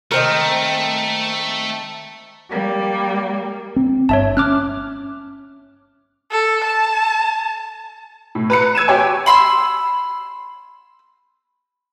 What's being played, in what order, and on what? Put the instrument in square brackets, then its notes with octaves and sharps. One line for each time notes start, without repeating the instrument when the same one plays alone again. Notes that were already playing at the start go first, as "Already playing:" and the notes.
[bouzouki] D#3 C4 A#4 [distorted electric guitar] A3
[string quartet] G3 A#3
[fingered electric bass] C4
[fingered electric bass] G1 [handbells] C#5 E5 A5
[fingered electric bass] C#4 [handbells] D6 F6 F#6
[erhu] A4
A5
[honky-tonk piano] A2
B4 A#5 C#7
E6 G#6 D#7 E7
F#4 G4 C#5 G5 G#5
[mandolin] B5 C6 E6